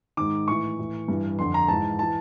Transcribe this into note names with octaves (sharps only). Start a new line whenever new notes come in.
G#2 D#3 D6
A2 E3 C#6
A2 E3
G2 E3
F2 D3 C6
A#5
G#2 E3 A5
E3 A5